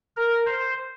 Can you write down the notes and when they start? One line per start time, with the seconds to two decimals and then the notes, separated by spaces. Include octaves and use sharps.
0.17 A#4
0.46 C5